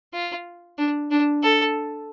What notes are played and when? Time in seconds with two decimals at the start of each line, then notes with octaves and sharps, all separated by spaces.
0.14 F4
0.78 D4
1.11 D4
1.43 A4